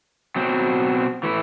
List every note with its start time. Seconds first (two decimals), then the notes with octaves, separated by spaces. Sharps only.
0.36 B2 F#3 C4
1.23 E3 A3 E4